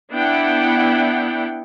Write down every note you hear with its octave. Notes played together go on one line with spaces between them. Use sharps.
B3 D4 E4 F#5 G5